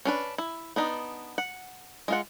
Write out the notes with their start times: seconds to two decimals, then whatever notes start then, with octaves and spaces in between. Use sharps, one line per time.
0.05 C#4 D4 B4
0.38 E4
0.76 B3 D4 D#4
1.38 F#5
2.08 G#3 F4 F#5